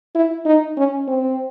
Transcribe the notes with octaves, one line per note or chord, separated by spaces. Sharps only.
E4
D#4
C#4
C4